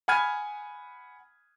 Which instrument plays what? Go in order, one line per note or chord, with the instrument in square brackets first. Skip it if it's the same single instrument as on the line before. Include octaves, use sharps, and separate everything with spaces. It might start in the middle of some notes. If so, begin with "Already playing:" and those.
[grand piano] F#5 G#5 B5 F6 G#6 D#7